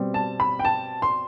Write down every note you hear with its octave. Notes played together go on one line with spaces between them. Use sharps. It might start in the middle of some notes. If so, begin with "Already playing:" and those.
Already playing: B2 G3 C4
A5
B5
G5
A5
C6